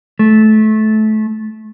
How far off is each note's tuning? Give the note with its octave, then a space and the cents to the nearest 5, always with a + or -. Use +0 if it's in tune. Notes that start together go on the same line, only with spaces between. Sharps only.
A3 -20